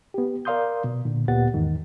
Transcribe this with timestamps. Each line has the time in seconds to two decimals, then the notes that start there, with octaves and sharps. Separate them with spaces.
0.14 B3 G4
0.45 A#4 D5 F5 C6 D#6 G6
0.84 B2
1.05 A#2 D3
1.28 D2 A#2 B3 G4 F#5 A6
1.54 E2 G#2 D#3